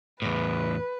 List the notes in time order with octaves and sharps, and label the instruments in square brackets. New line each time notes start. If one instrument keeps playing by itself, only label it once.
[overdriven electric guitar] E2 A2 [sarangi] B4